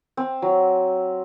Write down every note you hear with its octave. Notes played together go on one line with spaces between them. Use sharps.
C4
F#3